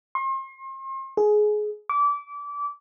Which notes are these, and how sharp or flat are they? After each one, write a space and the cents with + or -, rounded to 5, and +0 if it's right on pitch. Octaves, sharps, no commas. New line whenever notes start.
C6 +40
G#4 +20
D6 -25